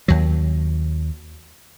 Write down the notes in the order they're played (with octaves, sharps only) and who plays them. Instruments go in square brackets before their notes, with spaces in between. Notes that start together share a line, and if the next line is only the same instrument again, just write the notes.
[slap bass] D#2 F#3